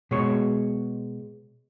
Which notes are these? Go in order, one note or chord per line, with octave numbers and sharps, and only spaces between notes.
B2 G#3 C#5